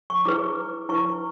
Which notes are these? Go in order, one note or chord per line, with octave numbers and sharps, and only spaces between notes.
C#6
E4 G#4 B4 D6
E4 B4 C#6